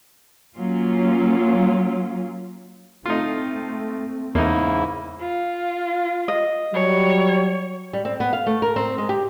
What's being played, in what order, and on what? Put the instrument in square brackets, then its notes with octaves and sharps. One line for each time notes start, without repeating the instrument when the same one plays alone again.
[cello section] F#3 A#3 C#4 F4
[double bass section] A3 C4 [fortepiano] D#4 F4
[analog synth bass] E2 [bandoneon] G#2 C#3 E4 [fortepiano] A#3 D#4
[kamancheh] F4
[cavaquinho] D#5
[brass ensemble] F#3 G3 [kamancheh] C#5
[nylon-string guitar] G3
C4
B3
F5
A3
A#4
C4
G#3
G4